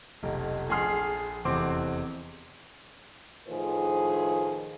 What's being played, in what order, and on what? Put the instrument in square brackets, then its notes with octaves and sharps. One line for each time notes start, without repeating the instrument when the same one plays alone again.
[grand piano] F1 B1
A#1 G#4 A4 C6 F6 C7
F1 E2 C4 C6 D6
[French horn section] A2 D#3 F3 G#4 B4 C5